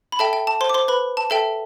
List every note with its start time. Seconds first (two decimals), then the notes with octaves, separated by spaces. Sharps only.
0.12 B5
0.19 A4 E5 G5 A5
0.33 G5
0.47 A5
0.61 C5 C6
0.69 D6
0.74 C5 C6
0.88 B4 B5
1.17 A5
1.30 A4 E5 G5 A5